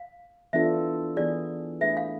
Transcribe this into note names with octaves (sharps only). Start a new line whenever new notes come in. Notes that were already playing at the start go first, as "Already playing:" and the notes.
Already playing: F5
E3 B3 D4 F4 A4 E5
E3 B3 E4 G#4 D5
A3 D4 G#4 B4 E5
F5